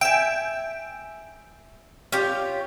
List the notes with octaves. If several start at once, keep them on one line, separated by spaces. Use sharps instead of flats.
E5 G5 G#5
C#4 F4 G4